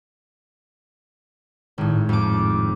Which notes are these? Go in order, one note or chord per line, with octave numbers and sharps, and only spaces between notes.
G#1 A2
F2 D6